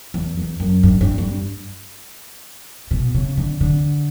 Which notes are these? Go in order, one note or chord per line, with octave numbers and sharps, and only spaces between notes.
E2
E2
F#2
G2
G2
G2
B2
C#3
D3
D3